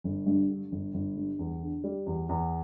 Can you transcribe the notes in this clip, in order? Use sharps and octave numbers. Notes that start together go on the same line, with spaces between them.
G1
G2
D3
G1
G1
G2
E2
D3
G3
E2
E2